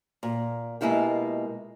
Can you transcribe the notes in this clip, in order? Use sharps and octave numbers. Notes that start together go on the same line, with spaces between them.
A#2
B2 G#3 A#3 E4 F4 G4